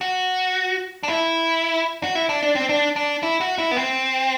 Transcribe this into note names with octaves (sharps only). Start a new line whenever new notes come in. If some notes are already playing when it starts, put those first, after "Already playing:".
F#4
D4
E4
F#4
E4
D4
D4
C4
D4
D4
E4
F#4
E4
B3
C4